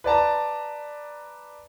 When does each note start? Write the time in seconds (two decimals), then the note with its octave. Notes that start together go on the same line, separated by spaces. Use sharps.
0.04 B4 D5 A5 A#5